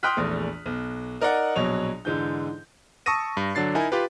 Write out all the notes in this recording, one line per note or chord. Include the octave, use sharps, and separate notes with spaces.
G5 C6 D#6 F6 F#6 B6
A#1 E2 A3
B1
D#4 A#4 D5 D#5 F#5
A#1 B2 F#3 C#5 F7
G#2 D3 E3 G6
A5 C#6 D#6 E6 A#6 D#7
G2
D3 F#3 D4 A6 C7
D#4 E4 A#4 G#5
F4 G4 B4